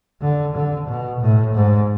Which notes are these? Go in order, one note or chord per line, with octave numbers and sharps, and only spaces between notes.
D3
D3
B2
A2
G#2